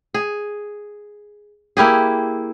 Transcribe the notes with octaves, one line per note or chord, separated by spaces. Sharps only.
G#4
A#3 E4 G4 G#4